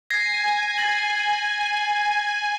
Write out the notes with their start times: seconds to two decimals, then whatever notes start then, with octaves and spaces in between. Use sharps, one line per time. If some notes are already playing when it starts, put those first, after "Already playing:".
0.10 G#5 G#6 A#6 C7
0.78 A6 A#6 F#7